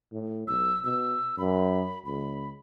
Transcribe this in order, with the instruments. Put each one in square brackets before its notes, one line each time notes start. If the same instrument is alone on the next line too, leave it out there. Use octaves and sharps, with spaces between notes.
[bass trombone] A2
[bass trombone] B1 [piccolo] E6
[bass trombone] B2 [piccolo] E6
[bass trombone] F#2 [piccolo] B5
[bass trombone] C#2 [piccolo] B5